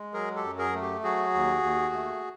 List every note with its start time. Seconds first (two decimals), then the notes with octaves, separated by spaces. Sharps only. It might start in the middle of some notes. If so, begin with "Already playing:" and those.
Already playing: G#3
0.13 F#3 G#4 A#4
0.36 G4 A4
0.44 F#2
0.58 G#4 A#4
0.74 A3
0.82 G4
1.03 F#3 F#4 G#4
1.34 D#2
1.63 D#2
1.94 A3